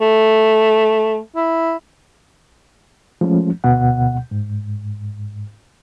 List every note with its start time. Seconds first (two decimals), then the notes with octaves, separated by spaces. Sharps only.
0.01 A3
1.36 E4
3.21 F3 G#3 A3 C#4
3.64 D2 B2 F#5
4.31 G#2